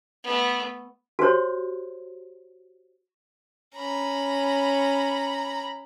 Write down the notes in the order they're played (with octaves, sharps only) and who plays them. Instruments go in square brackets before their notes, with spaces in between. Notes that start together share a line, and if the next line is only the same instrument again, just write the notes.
[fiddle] A3 B3
[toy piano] F#4 G4 C5 C#5
[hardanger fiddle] C#4 [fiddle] A#5 B5